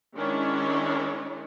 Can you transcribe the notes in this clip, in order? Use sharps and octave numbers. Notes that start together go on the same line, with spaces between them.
D#3 G#3 C#4 D4 E4 C#5